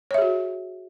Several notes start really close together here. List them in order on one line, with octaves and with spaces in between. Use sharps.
C#5 E5 G#4 F#4